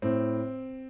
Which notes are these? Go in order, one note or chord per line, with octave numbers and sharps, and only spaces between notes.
A2 C4